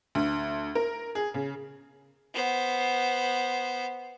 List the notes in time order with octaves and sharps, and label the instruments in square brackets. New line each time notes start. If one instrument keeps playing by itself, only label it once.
[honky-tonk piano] D2
A#4
G#4
C#3
[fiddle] B3 C5